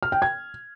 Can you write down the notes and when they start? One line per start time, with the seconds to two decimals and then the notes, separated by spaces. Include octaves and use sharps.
0.03 F6
0.12 G5
0.22 G#6